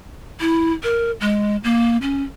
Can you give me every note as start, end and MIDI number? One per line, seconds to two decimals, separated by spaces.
0.41 0.73 64
0.83 1.11 70
1.21 1.57 56
1.64 1.97 58
2.02 2.23 61